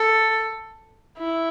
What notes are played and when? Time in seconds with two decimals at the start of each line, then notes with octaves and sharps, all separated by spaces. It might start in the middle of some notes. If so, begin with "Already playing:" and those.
Already playing: A4
1.18 E4